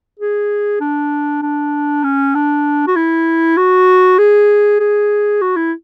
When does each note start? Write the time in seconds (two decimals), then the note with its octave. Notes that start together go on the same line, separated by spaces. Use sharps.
0.20 G#4
0.81 D4
1.42 D4
2.04 C#4
2.35 D4
2.87 F#4
2.96 E4
3.57 F#4
4.19 G#4
4.80 G#4
5.42 F#4
5.57 E4